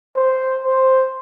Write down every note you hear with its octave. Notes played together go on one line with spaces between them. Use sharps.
C5
C5